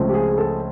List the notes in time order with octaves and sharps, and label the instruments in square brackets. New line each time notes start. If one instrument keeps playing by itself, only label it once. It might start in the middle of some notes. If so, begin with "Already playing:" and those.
Already playing: [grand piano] C#2 C#3 F3 A3 C4
G4
G#4
G#4
A4